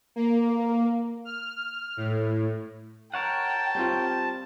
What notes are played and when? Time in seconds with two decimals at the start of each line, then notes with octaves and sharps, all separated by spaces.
0.16 A#3
1.25 F6
1.97 A2
3.14 A#4 C#5 F#5 G5 A5
3.75 G3 C4 F4